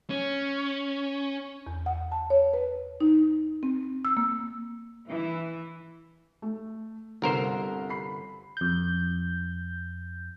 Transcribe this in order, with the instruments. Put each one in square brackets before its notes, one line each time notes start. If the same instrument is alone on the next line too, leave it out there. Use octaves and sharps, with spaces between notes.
[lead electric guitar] C#4
[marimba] E2
F#5
A5
C#5
B4
D#4
C4
E6
A#3
[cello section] E3
[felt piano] A3
[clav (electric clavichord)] G1 A#4 C5 [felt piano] C2 G2 C7
[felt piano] B5 C7
[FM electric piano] F2 G6